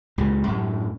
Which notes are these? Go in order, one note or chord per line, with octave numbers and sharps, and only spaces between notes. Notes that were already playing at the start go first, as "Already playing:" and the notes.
C#2 A#2 C#3
F#2 A2